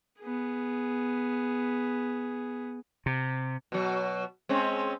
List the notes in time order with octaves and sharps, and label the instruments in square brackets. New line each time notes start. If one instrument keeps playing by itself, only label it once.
[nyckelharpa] B3 G#4
[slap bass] C3
[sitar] B2 F#3
G#3 C4 C#4